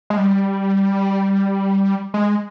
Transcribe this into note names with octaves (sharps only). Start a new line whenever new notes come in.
G#3
G3
G#3